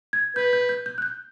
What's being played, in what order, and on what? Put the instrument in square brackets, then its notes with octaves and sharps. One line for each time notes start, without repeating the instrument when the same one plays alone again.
[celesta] G#6
[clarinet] B4 [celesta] G6
[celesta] G6
G6
G6
F#6
G6